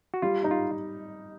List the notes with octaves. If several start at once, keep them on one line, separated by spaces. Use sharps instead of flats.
F#4
G3 F4
D#4
F4